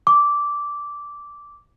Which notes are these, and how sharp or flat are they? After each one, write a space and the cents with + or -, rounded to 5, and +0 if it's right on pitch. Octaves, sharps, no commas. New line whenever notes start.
D6 -10